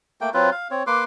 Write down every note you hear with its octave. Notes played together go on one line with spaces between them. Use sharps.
A3 A#3 G5
F#3 C4 F4 B4
F5
C4 C#5
A#3 B4 C6 D6